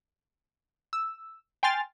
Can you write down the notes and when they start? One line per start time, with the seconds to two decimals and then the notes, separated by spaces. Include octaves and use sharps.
0.93 E6
1.63 G5 G#5 C6 F6 A6